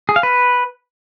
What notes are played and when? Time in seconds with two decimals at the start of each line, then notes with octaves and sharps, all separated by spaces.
0.09 G#4
0.16 F5
0.23 B4